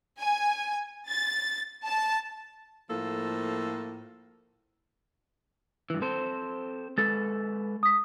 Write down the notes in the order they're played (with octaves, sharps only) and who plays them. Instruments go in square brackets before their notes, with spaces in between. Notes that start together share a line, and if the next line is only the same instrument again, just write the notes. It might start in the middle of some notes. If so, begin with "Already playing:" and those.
[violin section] G#5
A6
A5
[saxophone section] A2 F3 A#3 A4
[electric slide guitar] G2 E3
C4 A4 C5
[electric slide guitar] G#3 A4 B4 [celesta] A6
[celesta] D#6 B6